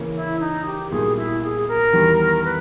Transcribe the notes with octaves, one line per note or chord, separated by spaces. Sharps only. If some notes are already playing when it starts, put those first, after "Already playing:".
Already playing: C#3 E3 A#3 C#4
E4
D#4
G4
B1 A#2 G3 G#4
E4
G#4
A#4
E2 D#3 G3
B4